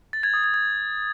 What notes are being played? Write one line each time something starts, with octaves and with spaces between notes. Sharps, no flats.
A6
G#6
D#6
G#6
G#6